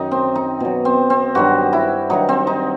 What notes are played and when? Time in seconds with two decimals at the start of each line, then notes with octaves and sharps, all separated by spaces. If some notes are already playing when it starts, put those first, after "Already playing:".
Already playing: F#2 D#3 D#4
0.11 C4
0.35 D#4
0.60 B2 F#3
0.85 C4
1.10 C4
1.35 G2 D#3 F#3 F#4
1.73 E4
2.10 G2 D#3 F#3 D#4
2.29 C4
2.47 D#4